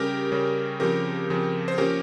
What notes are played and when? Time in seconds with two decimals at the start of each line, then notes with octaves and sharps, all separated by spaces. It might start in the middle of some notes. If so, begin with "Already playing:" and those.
Already playing: C#3 G3 C#4 G4 A#4
0.32 C#3 G3 C#4
0.80 C#3 F3 C4 G4 A#4
1.30 C#3 F3 C4
1.68 C5
1.78 F3 A#3 C#4 G4 A#4